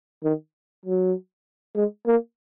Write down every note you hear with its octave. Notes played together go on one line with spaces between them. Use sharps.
D#3
F#3
G#3
A#3